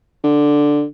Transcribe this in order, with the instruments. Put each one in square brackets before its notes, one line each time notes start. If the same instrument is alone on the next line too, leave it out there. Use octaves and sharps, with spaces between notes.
[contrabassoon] D3